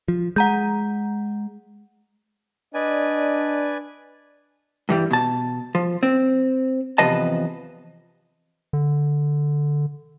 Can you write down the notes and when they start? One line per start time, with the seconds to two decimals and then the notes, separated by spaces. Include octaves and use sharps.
0.08 F3
0.36 G#3 F#5 A#5 G6
2.74 D4 B4 D5 D#5 G#5
4.89 G2 E3 G3
5.11 B2 A5
5.75 F3
6.03 C4
6.98 E2 C3 F3 B4 D#5 A5
8.73 D3